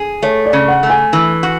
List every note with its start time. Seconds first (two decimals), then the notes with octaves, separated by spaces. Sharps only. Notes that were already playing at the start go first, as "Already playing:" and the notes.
Already playing: G#4
0.23 A3 C#5
0.46 D5
0.53 C#3
0.68 F#5
0.83 A3
0.90 G#5
1.13 E3
1.43 F#4